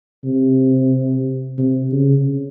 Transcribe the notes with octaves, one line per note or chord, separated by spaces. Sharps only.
C3
C3
C#3